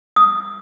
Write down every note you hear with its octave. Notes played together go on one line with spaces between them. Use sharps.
D#6